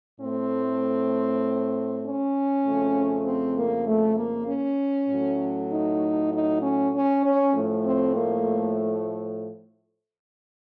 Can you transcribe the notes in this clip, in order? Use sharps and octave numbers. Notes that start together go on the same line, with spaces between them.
A2 A3 C4
C#4
F2 C#3 A3
C4
A#3
A3
A#3
C#4
A2 F#3 A3
D#4
D#4
C#4
C#4
C#4
A2 F3 A3
C4
A#3